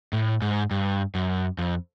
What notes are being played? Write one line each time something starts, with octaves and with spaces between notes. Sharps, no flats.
A2
G#2
G2
F#2
F2